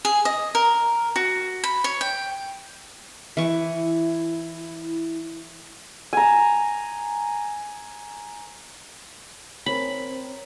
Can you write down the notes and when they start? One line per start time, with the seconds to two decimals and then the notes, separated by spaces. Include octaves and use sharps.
0.05 G#4
0.25 D#5
0.55 A#4
1.16 F#4
1.64 B5
1.84 C#5
2.01 G5
3.37 E3 E4 C#6
6.13 G#5 A#5
9.66 C4 C#4 A#4 B5